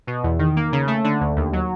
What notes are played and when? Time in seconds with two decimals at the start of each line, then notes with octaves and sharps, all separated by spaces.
0.07 B2
0.23 E2
0.39 D#3
0.56 A#3
0.72 C#3
0.87 A3
1.04 D3
1.21 D2
1.36 D#2
1.53 F#3